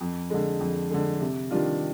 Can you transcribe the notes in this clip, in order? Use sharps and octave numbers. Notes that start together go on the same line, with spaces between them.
F2
D3 G#3
F2
D3 G#3
C3
D#3 G3 D4 F4